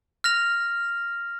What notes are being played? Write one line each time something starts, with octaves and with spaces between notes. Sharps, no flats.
F6 A#6 F7